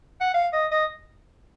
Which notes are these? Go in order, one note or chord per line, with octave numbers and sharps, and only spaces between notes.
F#5
F5
D#5
D#5